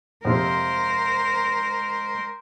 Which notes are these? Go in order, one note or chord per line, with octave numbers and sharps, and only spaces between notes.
F2 C3 G#3 C4 A#4 C5